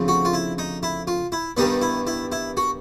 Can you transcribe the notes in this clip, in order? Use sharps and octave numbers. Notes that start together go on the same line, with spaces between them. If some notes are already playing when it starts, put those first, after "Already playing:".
Already playing: D2 C#3 F3 A3 C4
F#4
F4
E4
D#4
E4
F4
E4
G2 D#3 G3 B3 D#4
E4
E4
E4
F#4